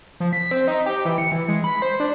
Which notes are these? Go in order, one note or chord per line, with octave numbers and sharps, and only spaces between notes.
F3
B6
C4
D#4
G4
E3
C#7
E3
G#3
B5
C5
D4